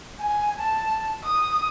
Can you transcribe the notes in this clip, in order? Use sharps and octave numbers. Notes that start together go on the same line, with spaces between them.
G#5
A5
D#6